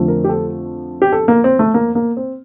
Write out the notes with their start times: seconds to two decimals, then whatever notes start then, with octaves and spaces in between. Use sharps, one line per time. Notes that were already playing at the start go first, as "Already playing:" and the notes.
Already playing: F2 D3 F3 A3
0.08 A#4
0.24 G4
0.29 A4
1.02 G4
1.13 A4
1.28 A#3
1.44 C4
1.59 A3
1.74 A#3
1.95 A#3
2.17 C4